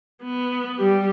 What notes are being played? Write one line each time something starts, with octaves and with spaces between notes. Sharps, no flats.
B3
G3 G4